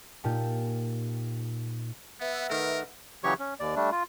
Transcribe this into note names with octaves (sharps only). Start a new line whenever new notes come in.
A#2 D#4 F4 G4 F5 A5
B3 B4 E5 F#5
D#3 A3 A#4
C#3 E3 F#3 G4 C#5 C#6
C#4
D#2 D5
G3 A3 D4
F4